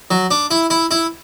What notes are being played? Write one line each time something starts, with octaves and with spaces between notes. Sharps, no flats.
F#3
D4
E4
E4
E4